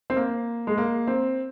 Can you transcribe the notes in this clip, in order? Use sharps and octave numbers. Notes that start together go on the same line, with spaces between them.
C4
A#3
G#3
A#3
C4